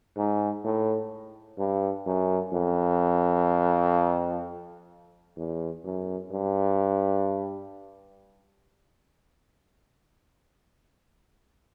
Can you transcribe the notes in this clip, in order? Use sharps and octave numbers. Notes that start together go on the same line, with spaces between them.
G#2
A2
G2
F#2
F2
E2
F#2
G2